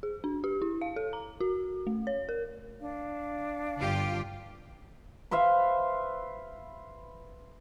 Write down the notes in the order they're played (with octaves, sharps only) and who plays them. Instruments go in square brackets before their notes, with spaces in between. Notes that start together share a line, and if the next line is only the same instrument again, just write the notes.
[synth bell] G#4
D4
G4
E4
F5
A4
A#5
F#4
A3
C#5
A#4
[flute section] D4 F5
[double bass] G1 [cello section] F4 G4
[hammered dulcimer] B4 C5 E5 F5